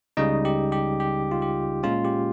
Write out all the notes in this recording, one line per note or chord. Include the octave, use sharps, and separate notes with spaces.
C#2 C#3 G3 D#4 D#5
G4
G4
G4
F4
G4
A#2 G#3 C#4 F4
G4